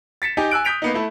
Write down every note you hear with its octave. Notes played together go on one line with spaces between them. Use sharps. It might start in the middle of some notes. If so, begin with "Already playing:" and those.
A6 B6 C#7 E7
D#4 G4 G#5
G#5 E6 F#6 D7
D#6 G6 B6 D7 F7
A#3 B3 D#4
A3 E4